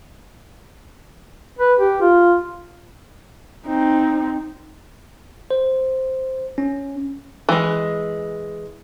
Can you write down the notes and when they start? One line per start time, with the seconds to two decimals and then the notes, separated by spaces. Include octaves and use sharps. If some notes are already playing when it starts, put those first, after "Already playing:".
1.59 B4
1.79 G4
2.01 F4
3.67 C4 D#4
5.51 C5
6.58 C#4
7.49 E3 G#3